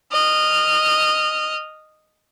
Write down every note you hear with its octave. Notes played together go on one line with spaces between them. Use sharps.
D#5 F6